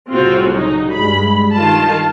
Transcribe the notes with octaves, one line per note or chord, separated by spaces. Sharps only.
C2 A2 C#3 C4 F4 F#4
F#3 D#4
G2 G#3 B5
G2 D#3 F4 A5